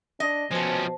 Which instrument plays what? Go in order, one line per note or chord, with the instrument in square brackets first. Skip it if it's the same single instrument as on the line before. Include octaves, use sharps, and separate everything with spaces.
[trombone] D4 [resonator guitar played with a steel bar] D#5
[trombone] B2 [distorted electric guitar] F3 C#4 [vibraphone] C5 A5